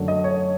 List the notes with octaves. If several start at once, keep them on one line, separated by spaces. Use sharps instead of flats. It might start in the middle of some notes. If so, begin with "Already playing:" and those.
Already playing: F#2 D3 F#3 A3 D4
D#5
C#5